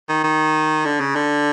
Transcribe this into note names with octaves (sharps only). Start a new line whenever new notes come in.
D#3
D#3
D3
C#3
D3